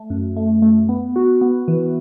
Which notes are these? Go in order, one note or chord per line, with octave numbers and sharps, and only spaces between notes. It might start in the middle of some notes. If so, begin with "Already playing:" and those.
Already playing: A3
F#2
A3
A3
B3
F#4
B3
E3